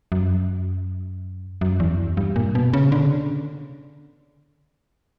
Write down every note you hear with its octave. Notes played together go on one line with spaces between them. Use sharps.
F#2
F#2
E2
G2
A#2
B2
C#3
D3